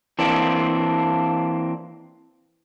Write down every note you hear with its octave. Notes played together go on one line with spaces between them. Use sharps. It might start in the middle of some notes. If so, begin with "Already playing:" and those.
E3 A#3 C4 D4